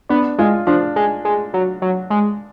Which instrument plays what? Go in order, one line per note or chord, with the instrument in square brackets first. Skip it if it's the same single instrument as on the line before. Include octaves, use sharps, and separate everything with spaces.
[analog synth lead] B3 [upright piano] D4
[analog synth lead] G#3 [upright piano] F4
[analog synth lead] F3 [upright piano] D4
[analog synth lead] G#3
G#3
F#3
F#3
G#3